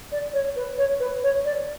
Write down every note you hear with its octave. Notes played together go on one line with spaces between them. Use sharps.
D5
C#5
B4
C#5
B4
C#5
D5